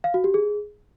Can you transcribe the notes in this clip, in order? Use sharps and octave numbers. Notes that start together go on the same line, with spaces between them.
F5
F#4
G4
G#4